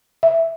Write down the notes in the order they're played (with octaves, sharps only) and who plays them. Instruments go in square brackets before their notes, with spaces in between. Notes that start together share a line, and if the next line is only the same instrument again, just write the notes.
[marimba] E5